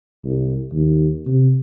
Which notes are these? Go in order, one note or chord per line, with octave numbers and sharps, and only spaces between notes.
C2
D#2
C3